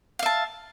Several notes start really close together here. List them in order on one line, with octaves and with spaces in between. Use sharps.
F5 E5 A5